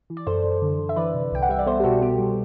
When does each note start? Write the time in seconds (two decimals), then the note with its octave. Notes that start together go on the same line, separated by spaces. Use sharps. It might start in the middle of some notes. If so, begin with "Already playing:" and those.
0.10 E3
0.17 D5
0.27 F#2 A4 C5
0.44 F#2
0.62 D3
0.79 D3
0.89 E5
0.96 E3 B4 D5
1.14 C3
1.32 C2 G5
1.42 F#5
1.49 G3 E5
1.59 D5
1.66 B3 A4 C5
1.80 G4
1.84 B2 F#4 A4
2.02 B3 G4
2.19 G3